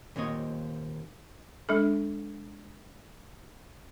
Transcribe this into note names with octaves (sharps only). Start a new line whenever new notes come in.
D#2 A#2 C4 C#5 D#5
G#3 D4 A4